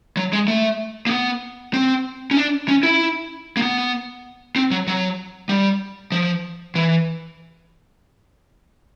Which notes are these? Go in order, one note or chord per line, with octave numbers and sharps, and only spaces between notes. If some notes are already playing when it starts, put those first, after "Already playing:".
F#3
G#3
A3
A#3
B3
C4
C#4
D4
C#4
E4
A#3
B3
C4
F#3
F#3
G3
F3
E3